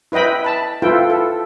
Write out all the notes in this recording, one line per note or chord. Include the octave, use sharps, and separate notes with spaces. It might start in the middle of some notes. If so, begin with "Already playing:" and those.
E4 B4 D#5 G5 B5
A5 B5
E4 F4 A4 B4 G5
A4